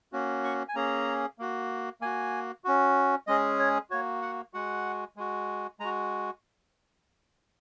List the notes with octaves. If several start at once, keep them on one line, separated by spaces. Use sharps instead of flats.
A#3 C#4 F#4
C#6
G#5
A#3 C#4 G#4 A#5
A#3 F#4
A#3 F#4 G#5
C#4 F#4
G#3 C#4 G#4 D#5
C#5
A#3 F#4 C#5
F#5
G#3 F#4 F#5
G#3 F#4
G#3 F#4 A#5